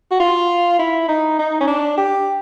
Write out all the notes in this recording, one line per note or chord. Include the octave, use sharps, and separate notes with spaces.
F#4
F4
E4
D#4
D#4
C#4
D4
G4